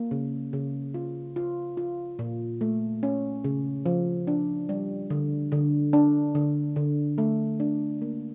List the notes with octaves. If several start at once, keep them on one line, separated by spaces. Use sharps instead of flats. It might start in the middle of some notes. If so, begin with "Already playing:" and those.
Already playing: A#3
C#3
C#3
F4
F4
F4
A#2
A3
C#4
C#3
F3
D4
G3
D3
D3
D4
D3
D3
A3
D4
A#3